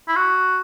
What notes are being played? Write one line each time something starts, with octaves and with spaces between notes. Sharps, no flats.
E4
F#4